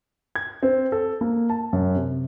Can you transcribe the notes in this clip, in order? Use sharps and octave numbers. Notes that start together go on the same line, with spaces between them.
G#6
C4
A4
A#3
A5
F#2
C3